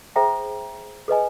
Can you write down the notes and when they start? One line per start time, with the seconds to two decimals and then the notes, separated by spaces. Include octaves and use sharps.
0.16 G#4 C5 E5 G5 A#5
1.08 G#4 B4 D#5 G#5